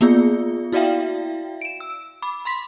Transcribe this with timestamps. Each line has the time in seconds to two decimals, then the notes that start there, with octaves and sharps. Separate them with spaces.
0.01 A#3 B3 F4 G#4 D5
0.72 E4 F#4 D5 E5 F5 G5
1.61 D7 E7
1.80 E6
2.22 B5 D6
2.45 B5 C6 B6